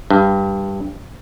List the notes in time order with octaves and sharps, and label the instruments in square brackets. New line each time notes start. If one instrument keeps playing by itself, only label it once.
[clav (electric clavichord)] G2